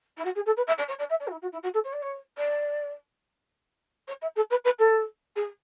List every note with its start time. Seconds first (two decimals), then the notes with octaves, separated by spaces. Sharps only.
0.17 E4
0.24 F#4
0.35 G#4
0.46 A4
0.56 B4
0.67 E5
0.78 D5
0.88 C#5
0.98 D5
1.09 E5
1.20 D5
1.27 F#4
1.31 E4
1.41 F#4
1.52 E4
1.63 F#4
1.74 A4
1.84 C#5
1.93 D5
2.02 C#5
2.37 D5
4.07 C#5
4.21 E5
4.36 A4
4.50 B4
4.64 B4
4.79 A4
5.35 G#4